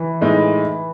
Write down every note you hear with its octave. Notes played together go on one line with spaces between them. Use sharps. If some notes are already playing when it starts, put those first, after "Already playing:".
Already playing: E3
A2 G#3 D#4